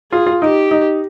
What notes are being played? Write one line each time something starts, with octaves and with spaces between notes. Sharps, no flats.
F4 G#4
F4
D#4 G4
D#4